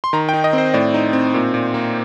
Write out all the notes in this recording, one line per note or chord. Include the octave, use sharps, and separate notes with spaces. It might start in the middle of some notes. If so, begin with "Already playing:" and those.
C6
D#3 A#5
G5
D#4
D#5
C4 C5
A2 D5
D#4
C4
A#2
A#2
A#3